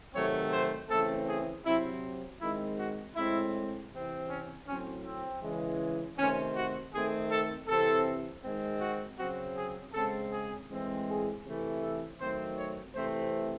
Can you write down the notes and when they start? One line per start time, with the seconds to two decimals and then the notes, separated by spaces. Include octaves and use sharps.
0.14 C3 D#3 F#3 A3 C4 C#5
0.53 C5
0.90 C#3 E3 A3 C4 A4
1.28 G#4
1.65 C3 F#3 C4 E4
2.40 D#3 G#3 C4 E4
2.78 F#4
3.16 A2 G#3 C4 E4
3.91 C3 E3 C4
4.29 C#4
4.66 A2 F#3 C4 C#4
5.05 C4
5.42 C#3 E3 G#3
6.18 C3 D#3 A3 C4 C#4
6.55 F#4
6.93 D#3 A3 C4 G#4
7.30 A4
7.68 C3 E3 C4 A4
8.43 D#3 G#3 C4
8.81 F#4
9.18 C#3 F#3 C4 F#4
9.57 G#4
9.94 C#3 G#3 C4 A4
10.32 G#4
10.69 A2 E3 G#3 C4
11.08 G#4
11.45 C3 E3 A3
11.82 A4
12.19 D#3 F#3 A3 C4 C5
12.58 C#5
12.95 C3 E3 A3 C4 C5